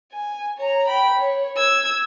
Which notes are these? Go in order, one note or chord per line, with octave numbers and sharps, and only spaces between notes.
G#5
C#5 A#5
G5 B5
C#5
E6 G#6